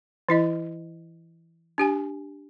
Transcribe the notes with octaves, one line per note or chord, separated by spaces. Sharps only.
E3 E4 D#5
D4 G4 G#5